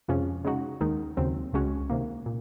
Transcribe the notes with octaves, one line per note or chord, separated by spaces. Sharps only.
F2 C3 F3 G#3 C#4
C#3 G#3 D#4 F#4
D#2 D#3 G#3 D#4
D#2 C#3 F#3 C4
C#2 C#3 G#3 C#4 F#4
C3 D#3 A#3
A#2